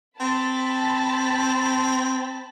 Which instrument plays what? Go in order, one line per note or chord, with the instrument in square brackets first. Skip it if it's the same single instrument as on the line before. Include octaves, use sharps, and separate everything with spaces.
[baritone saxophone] C4 [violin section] A5 B5